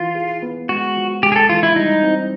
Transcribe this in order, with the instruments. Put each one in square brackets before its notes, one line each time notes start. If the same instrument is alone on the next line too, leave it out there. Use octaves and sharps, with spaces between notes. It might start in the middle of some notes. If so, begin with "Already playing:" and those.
Already playing: [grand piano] E3 [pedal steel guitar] F4
[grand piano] G#4
B3
[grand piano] G#3 [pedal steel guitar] F#4
[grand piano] F3
[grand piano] G#3 [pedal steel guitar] G4
[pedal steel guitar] G#4
A4
[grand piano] E3 [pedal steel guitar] F4
[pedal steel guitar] E4
[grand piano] G3 [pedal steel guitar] D#4
[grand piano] C4